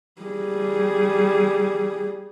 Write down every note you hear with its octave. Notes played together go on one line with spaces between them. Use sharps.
G3 G#4